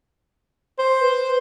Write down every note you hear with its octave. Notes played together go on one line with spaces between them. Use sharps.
C5
B4